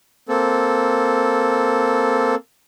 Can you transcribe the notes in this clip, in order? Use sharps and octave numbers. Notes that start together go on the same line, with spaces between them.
A#3 C4 A4